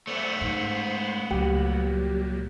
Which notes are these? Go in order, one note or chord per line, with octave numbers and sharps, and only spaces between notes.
A3 B3 C5 D5 E5
G#2 C5 C6 C#6
C#2 A#2 F#3 G3 G4